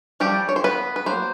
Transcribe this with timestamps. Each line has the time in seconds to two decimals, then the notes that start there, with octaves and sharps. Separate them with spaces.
0.20 F3 G3 A3 D4 G4
0.49 C#5
0.56 C5
0.64 B3 B4
0.96 B4
1.06 F#3 A#3 C5